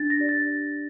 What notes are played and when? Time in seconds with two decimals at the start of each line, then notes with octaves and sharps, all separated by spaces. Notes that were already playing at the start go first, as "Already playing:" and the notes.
Already playing: D4 A6
0.10 A#6
0.20 G4 D5
0.29 A6